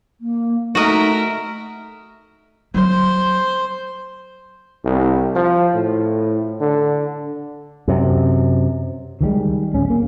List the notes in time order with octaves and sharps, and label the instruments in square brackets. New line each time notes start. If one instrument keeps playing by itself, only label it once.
[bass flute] A#3
[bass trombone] A3 [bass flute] D#4 [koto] F#4 D#5 [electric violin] A#4 E5
[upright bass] F#3 [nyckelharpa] C5
[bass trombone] C2
F3
A2
D3
[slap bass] F#2 C3
[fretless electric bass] D#3 E3 G3 G#3
D1 C#4
A#3